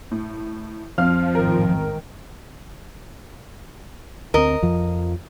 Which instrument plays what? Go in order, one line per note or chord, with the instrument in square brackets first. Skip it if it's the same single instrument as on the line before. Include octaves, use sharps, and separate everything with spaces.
[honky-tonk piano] A2
[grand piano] F2 [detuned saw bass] F3 [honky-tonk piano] F5 F6
[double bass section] A1 G#2 D#3 [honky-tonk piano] A#4
[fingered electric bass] D2 C4 [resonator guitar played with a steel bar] A#4 D#5
[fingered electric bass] F2 F3